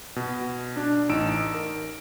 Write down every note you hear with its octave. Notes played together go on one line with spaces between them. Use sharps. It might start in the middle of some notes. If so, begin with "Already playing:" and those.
B2
D4
A1 D#4 A5 E6 D7 E7
A#4